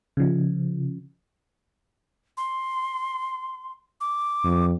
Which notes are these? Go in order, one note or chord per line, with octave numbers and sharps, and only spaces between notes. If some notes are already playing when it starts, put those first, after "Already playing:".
C#3 F3
C6
D6
F2